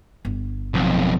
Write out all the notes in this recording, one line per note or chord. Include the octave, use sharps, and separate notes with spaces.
G1
B1 F2